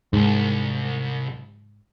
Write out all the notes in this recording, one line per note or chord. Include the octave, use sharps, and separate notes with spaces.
C2 G#2